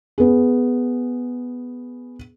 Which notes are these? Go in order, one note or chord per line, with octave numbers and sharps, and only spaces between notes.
B3 G#4